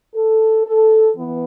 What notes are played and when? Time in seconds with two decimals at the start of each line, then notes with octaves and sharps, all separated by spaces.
0.14 A4
0.64 A4
1.16 E3 B3